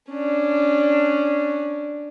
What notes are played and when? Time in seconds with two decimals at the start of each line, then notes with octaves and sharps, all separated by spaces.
0.10 C#4 D4